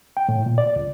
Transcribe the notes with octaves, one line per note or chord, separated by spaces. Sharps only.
G5
A2
A#2
D5
C#2